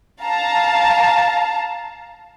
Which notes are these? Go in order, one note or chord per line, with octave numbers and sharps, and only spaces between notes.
F5 A5 A#5